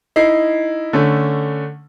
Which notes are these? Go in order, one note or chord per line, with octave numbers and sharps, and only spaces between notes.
D#4 E4 C7
D3 A3 C#4